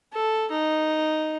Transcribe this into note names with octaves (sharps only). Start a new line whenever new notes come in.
A4
D#4